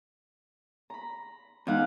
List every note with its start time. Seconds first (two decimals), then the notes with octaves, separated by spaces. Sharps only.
0.90 A#5 B5
1.67 E2 G#2 D#4 F5 F#5